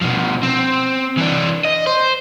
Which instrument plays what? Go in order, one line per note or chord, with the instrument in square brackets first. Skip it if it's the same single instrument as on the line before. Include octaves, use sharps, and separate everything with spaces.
[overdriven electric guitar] B2 F3
C4
E3 D4
D#5
C5